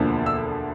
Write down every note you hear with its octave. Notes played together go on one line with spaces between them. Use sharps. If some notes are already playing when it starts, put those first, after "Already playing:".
Already playing: E1 D2 D3 F3 A#3
E6